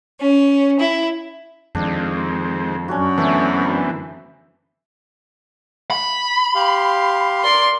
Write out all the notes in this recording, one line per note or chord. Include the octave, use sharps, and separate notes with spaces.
C#4
E4
F2 D#3 G#3 C4 D4
F#2 C#4 D4 F#4
D3 E3 A3 B3 C4 D4
B5
G4 F5 C6
A#4 D5 C6